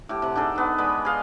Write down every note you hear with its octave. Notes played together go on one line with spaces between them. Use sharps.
A2 G4
C3 F#5
D4 D#4 G#4 A4
B3 D#4
G#3 B4 D5 B5
G#4 D#5 F5